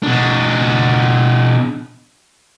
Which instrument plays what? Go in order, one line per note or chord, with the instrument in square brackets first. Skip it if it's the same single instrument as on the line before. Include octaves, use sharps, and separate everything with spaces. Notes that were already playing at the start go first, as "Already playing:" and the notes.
[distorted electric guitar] B2 D4